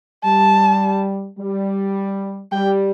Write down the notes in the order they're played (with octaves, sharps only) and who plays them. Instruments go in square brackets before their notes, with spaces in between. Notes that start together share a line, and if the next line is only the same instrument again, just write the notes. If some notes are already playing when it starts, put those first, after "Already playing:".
[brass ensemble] G3 [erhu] A5
[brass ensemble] G3
[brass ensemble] G3 [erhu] G5